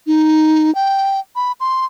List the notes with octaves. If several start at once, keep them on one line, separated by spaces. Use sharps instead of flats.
D#4
G5
B5
C6